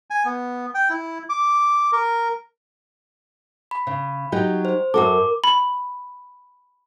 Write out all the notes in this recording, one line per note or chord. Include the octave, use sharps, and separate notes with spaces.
G#5
B3
G5
E4
D6
A#4
B5
C#3
F#3 D#4 G4
C5
F#2 F#4 A4 A#4 D6
B5